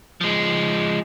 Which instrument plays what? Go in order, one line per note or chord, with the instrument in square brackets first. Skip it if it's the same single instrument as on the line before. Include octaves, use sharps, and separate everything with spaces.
[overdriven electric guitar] F3 G#3